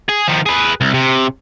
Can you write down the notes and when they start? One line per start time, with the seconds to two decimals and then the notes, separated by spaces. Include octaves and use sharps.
0.09 G#4
0.28 D#3 F3
0.46 G#4 B4
0.81 C2
0.94 C3